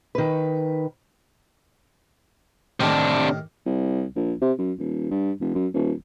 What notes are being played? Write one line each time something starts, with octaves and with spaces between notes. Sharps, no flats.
D#3 B4
A2 C3 D#3 D4 G4
C2
A#1
C3
F#2
D#1
G2
F1
F#2
D#1